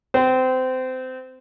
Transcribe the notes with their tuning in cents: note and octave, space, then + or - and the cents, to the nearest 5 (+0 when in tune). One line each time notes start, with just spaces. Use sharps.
C4 -25 C5 -25